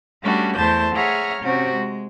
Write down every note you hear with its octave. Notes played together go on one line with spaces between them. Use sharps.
G3 A3 C#4 D4 F#4
E2 A3 C5 A5 G6
G#4 C#5 E5 F#5 A#5 F6
C3 C#4 F#4 C5
G#3